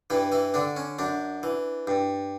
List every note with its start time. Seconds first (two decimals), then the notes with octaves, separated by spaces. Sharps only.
0.10 G2 E3 E4
0.32 E3 E4
0.54 D3 D4
0.76 C#4
0.99 F#2 D4
1.43 E3
1.87 G2